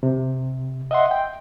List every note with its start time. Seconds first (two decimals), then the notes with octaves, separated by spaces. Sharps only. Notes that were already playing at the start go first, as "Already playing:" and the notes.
0.03 C3
0.91 D#5 E5 F#5 C6
1.11 G5